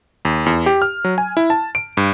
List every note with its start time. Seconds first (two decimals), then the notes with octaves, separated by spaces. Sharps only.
0.25 D#2
0.46 E2
0.66 G4
0.82 F6
1.04 F#3
1.18 G#5
1.37 E4
1.50 A5
1.75 D7
1.97 G2